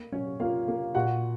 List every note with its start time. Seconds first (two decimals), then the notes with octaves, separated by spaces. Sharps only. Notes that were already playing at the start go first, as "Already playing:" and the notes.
Already playing: A#3
0.12 F#3 C#4 C#5
0.40 A#3 F4 F5
0.68 A#3
0.95 A#2 F#4 F#5